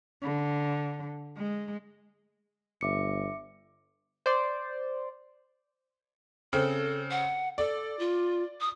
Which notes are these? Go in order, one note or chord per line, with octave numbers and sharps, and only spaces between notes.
D3
G#3
G1 E5 D6 C#7
C5 D5
C#3 C4 A4
F#5
A4 D5
F4
D#6